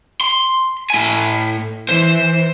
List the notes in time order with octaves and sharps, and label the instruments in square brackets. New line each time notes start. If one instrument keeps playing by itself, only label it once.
[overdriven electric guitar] C6
A2 G#5
[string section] E3 [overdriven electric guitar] C5